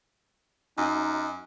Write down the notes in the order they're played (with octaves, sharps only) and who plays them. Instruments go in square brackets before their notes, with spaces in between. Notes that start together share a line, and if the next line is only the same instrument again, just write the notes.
[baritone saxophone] F#2 [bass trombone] D#4